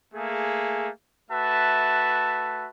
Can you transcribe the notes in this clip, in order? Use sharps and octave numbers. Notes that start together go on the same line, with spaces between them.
A3 A#3 G#4
A3 F#4 B4 E5 A5